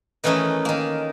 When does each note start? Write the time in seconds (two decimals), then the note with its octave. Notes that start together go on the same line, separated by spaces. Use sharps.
0.24 D#3 E3 A3 C#4 D#4
0.65 D#3 A#3